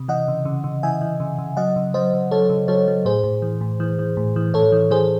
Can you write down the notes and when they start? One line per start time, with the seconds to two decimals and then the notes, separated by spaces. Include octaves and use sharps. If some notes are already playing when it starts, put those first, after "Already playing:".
Already playing: C3
0.08 E3 D#5 F#5
0.28 C#3
0.45 C#3
0.64 C#3
0.83 E3 E5 G#5
1.01 E3
1.20 C#3
1.38 C#3
1.57 F#3 D#5 F#5
1.76 C#3
1.94 F#3 C5 D#5
2.14 C#3
2.31 F#3 A4 C#5
2.49 C#3
2.68 F#3 A4 C#5
2.88 F#3
3.05 A2 G#4 C5
3.24 A2
3.42 E3
3.61 A2
3.80 E3
3.99 E3
4.17 A2
4.36 E3
4.54 A2 A4 C#5
4.72 E3
4.91 E3 G#4 C5